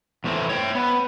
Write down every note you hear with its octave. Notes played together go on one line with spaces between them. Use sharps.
E2 A2 E3 C4 E4
C#5 F#5 G5
B3